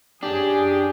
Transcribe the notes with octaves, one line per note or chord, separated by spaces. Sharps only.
F#2 D4 G4 G#4